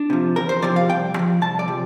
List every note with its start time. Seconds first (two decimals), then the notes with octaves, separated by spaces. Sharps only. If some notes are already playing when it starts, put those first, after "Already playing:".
Already playing: D4
0.10 C3 F3
0.36 E2 A#4
0.49 C5
0.62 C3 F3 D5
0.76 F5
0.90 C2 G5
1.16 C3
1.19 F3
1.42 C2 A5
1.59 D5
1.68 C3 F3